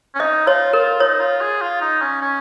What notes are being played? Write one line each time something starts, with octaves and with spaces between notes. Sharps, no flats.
C#4
D#4 D#5
F4 C#5
F4 A#4
D#4 C#5
F4
G#4
F4
D#4
C#4
C#4